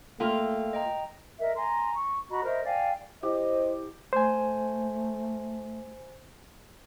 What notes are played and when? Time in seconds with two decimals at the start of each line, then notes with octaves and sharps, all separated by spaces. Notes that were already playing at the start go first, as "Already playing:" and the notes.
0.20 A3 A#3 F4 A4 E5 G5
0.73 D#5 G5 A#5
1.40 A#4 D#5 E5
1.56 G#5 A#5 C6
1.94 C#6
2.29 F#4 D#5 A#5 B5
2.44 A#4 C5 D#5 E5
2.64 D5 F5 G5 G#5
3.23 E4 G4 C5 D#5
4.13 A3 C5 G#5